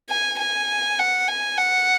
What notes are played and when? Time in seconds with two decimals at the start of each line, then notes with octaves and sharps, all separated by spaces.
0.09 G#5
0.39 G#5
0.99 F#5
1.28 G#5
1.58 F#5